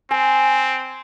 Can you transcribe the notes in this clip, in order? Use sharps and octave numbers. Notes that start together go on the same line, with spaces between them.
C4 G#5